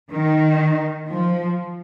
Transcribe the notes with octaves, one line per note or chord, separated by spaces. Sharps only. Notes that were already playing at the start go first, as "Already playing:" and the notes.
D#3
F3